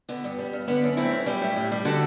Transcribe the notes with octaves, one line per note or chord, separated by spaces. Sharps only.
D3 B3
G2
G3
G2
D3 B3 D4
F#2
A3 C4 E4
F#2
G3 E4 G4
A2
A2
G3
D3 F#4 A4